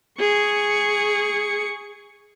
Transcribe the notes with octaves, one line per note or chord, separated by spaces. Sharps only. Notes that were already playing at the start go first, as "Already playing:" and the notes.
G#4 C#6